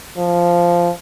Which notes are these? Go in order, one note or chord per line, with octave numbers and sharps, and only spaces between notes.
F3